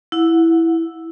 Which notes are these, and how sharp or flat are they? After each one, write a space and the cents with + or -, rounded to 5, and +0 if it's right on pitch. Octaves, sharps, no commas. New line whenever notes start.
E4 +0 F#5 -25